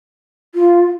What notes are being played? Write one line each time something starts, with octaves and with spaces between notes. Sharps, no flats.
F4